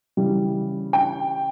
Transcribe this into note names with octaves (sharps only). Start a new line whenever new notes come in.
C#3 E3 G3
G5